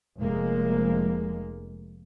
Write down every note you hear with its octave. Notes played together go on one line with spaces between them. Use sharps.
F1 G#3 A#3